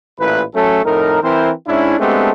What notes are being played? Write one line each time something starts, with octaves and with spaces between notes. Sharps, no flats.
A1 A#2 E4 B4
F#3 A3 C#4 A4
F2 A2 D#4 A#4
E3 C4 E4 A#4 C5
G#2 C#4 D4 E4
G#3 A3 B3 C4 D4 G4